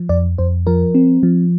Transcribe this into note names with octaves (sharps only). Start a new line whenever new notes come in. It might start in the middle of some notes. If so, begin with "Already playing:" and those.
Already playing: F3
F2 D5
F2 C5
F3 A#4
C4
F3